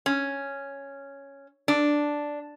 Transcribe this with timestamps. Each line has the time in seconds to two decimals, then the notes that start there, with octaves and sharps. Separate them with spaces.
0.06 C#4
1.68 D4